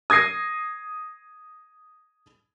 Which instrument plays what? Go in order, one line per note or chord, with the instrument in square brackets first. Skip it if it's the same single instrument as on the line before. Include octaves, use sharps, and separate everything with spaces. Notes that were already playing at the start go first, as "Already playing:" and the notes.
[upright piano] D#6 G#6 A#6 C7 D#7